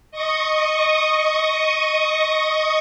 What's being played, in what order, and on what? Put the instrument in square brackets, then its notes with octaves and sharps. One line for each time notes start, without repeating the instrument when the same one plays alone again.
[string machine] D#5 C#6 D#6